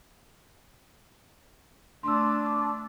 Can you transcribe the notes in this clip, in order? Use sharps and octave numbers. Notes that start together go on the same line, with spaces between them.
A3 D4 C6 E6